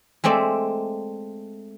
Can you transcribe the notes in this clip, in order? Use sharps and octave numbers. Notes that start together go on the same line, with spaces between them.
G#3 A3 C4 D5 E5